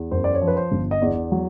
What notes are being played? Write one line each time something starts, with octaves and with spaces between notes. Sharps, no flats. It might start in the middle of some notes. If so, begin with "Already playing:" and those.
Already playing: E2
F#2 C5
D5
C#5
F3
B4
C5
G1
D#5
E2 D5
F#3